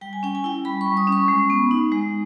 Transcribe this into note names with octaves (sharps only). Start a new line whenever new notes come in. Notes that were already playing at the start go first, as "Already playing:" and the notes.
G3 G5
G#5
C#4 G5
G#5
E4 G5
G3 B5
C#6
G3
D#6
C#4
C#6
G#3
B3
D#4
G#3